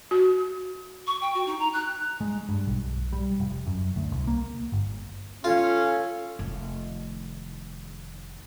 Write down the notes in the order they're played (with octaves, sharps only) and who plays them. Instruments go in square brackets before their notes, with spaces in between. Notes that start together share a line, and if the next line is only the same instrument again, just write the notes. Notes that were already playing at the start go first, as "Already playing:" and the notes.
[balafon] F#4
[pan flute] C#6
G5
F#4
D#4
A#5
F#6
[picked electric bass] G#3
G2
B1
G3
F1
F#2
D2
C2
A#3
G1
[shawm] C#4 [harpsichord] F4 [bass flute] A4 [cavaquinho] F5
[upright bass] F1 D#3